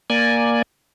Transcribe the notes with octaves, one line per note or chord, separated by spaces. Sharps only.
A#3 D5 G#5